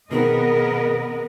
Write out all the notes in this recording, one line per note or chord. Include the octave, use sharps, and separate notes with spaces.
B2 D#3 B3 C4 G#4 A#4 D#5